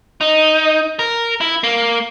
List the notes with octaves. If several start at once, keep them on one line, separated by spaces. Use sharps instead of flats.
D#4
A#4
E4
A#3